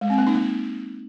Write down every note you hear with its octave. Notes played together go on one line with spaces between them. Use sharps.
G#3
C4
A#3
D#4
A#3